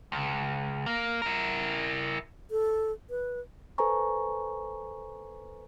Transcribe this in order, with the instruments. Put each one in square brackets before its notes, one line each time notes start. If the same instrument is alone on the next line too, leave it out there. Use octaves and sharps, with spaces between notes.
[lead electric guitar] C#2
A#3
E4 A#4
[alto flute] A4
B4
[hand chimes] A4 B4 C5 G#5 A#5 C#6